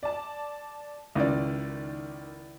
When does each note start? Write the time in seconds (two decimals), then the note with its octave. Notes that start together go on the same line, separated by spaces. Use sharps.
0.03 D5 A5
1.15 C#2 D#3 E4 D5